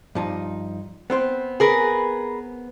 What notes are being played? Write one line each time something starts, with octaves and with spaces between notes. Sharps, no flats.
G2 F3 D#4
B3 C4 C5
G#4 A#4 B4